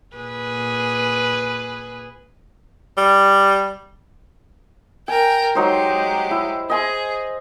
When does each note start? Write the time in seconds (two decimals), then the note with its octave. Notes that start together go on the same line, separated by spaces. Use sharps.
0.16 A#2 G#4 B4
2.98 G3
5.08 A#4 G5 G#5
5.55 F#3 G#3 D#4 G4 C5
6.31 E4
6.70 G#4 D#5 G#5 C6